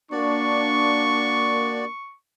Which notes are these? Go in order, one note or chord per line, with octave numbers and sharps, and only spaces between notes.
A#3 D4 F#4 D5 C#6